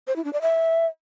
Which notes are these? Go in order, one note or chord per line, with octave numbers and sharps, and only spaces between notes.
C5
E4
D4
D5
E5